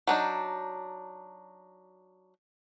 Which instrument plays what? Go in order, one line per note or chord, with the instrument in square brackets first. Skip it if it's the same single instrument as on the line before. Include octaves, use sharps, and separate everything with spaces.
[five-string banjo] F#3 D4 D#4